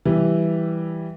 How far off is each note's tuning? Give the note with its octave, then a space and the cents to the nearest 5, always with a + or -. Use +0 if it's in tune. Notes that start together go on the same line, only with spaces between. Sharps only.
E3 +0 G3 +0